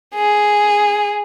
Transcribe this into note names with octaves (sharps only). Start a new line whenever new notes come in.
G#4